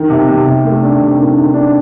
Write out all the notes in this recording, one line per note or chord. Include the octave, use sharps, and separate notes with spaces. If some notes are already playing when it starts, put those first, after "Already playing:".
Already playing: D#3
C3
C3
C3
A3
D4
C3
D#3
D#3
D4